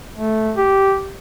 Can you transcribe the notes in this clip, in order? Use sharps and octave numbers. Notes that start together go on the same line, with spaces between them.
A3
G4